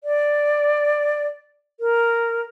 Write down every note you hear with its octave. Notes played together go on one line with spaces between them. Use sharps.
D5
A#4